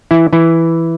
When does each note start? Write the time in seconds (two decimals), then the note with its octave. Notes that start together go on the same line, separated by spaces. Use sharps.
0.11 E3 E4
0.33 E3 E4